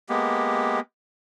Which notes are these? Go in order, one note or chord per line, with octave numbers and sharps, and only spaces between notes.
G#3 A#3 B3 G4